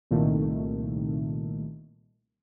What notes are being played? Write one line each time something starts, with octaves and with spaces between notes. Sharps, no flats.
C2 A#2 D#3 A3